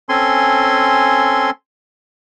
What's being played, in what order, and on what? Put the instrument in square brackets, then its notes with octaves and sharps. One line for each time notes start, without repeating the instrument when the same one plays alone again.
[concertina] C4 C#4 A4 G#5 C6